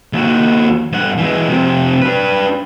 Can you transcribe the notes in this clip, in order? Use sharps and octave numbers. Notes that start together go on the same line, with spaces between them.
D#2 F#4
G2 F#5
E3 G#3
F2 C3
D4 B4